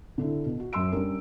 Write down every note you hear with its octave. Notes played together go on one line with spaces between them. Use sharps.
D3 D4 E4
B2
F#4
F#2 F#3 C6 E6 D7
G3 C#4 D4 A#4